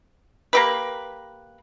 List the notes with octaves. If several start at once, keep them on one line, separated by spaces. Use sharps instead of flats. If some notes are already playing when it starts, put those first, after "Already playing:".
A#3 G4 B4